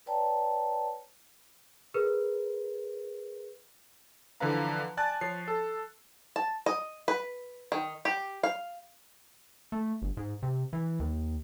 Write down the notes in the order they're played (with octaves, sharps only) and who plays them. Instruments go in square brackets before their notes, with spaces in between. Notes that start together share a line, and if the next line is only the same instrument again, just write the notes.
[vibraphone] B4 C#5 D5 G5 A5 A#5
[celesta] G#4 A#4 B4
[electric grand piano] D3 E3 F3 B4 F5 A#5
D5 G#5 A5 F#6 A6
F3 C#5 C7
A4
[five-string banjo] A5
D#5
B4
D#3
G4
F5
[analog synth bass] A3
G1
G#2
C3
E3
D#2